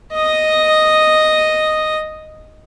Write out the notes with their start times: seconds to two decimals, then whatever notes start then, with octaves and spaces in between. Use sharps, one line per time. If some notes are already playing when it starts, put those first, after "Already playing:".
0.14 D#5 D#6